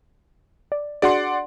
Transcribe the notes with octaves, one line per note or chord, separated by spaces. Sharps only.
D5
D4 F#4 G#4 D5 F#5 C6